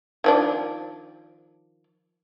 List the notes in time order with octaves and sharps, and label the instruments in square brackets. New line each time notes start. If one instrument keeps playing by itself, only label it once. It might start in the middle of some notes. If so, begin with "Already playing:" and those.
[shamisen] D#3 F3 D4